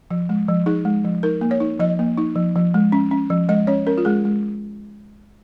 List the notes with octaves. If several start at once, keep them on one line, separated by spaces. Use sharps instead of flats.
F3
G#3
F3
D#4 G#4
G#3
F3
D#4 A#4
A#3
C#5
D#4
F3 D#5
A#3
D#4
F3
F3
G#3
C#4
C#4
F3
G#3 D#5
C#4 C#5
C#4 A#4
F4
G#3 G#4
G#3